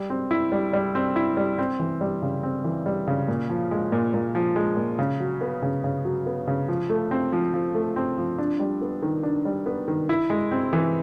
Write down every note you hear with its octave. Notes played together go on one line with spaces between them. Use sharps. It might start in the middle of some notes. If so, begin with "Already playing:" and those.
Already playing: G3
C4
E4
G3
G3
C4
E4
G3
C4
E3
G3
C#3
C4
E3
G3
C#3
A#2
F3
G#3
A#2
A#2
F3
G#3
A#2
C#3
F#3
B3
C#3
C#3
F#3
B3
C#3
F3
A3
C4
F3
F3
A3
C4
F3
D4
G3
B3
D#3
D4
G3
B3
D#3
E4
G#3
C4
E3